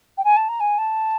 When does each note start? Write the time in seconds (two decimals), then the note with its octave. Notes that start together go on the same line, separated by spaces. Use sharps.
0.18 G5
0.24 G#5
0.37 A5
0.49 A#5
0.60 G#5
0.78 A5